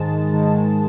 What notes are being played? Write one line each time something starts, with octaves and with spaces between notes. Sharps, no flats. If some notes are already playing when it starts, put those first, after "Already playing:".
Already playing: G#2 D#3 G#3 A5
G#2 D#3 G#3